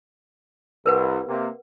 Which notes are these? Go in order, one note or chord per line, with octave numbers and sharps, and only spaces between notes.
C2 A#4 B4 F#5
C3 A#3